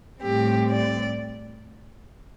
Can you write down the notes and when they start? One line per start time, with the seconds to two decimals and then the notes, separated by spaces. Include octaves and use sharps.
0.21 A2 G3 C4 G4
0.70 D5